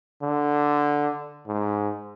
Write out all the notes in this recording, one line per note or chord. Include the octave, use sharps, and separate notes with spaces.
D3
G#2